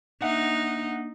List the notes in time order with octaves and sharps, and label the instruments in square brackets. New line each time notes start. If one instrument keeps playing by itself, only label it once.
[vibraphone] A#3 D4 [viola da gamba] D#4 [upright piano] E5 F#5